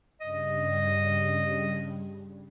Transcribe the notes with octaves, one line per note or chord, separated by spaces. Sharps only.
G2 C#3 G3 D#5